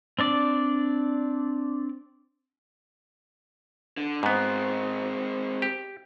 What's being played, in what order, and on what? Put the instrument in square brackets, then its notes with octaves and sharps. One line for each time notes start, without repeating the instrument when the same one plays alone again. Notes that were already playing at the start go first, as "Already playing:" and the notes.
[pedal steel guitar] C4 D4 D5
[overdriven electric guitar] D3
[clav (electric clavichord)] G#2 B3 [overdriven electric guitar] G#3 C4
[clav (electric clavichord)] G4